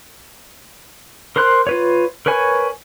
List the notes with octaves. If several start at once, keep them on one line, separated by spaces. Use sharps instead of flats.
A#4 C5 C6 F#6
F4 B4 C#5
A#4 B4 C#5 G#5